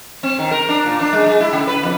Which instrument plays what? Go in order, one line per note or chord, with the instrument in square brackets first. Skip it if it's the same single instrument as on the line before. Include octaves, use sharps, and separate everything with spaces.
[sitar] C4
D#3
A#4
D4
A#2
D4
G#3
G#3
E4
C#3
B4
F2